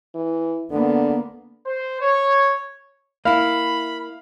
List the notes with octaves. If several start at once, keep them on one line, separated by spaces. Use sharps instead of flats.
E3
D3 A#3 B3
C5
C#5
A#3 E4 F5 B5